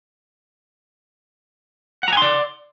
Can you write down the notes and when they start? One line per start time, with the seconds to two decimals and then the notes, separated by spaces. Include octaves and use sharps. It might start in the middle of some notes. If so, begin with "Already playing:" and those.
2.03 F#5
2.08 A#5
2.13 G#5
2.17 C6
2.22 D5